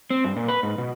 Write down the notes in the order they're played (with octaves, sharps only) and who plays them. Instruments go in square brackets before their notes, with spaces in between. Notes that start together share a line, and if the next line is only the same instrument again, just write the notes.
[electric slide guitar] C4
G2
A#2
B4
G#2
B2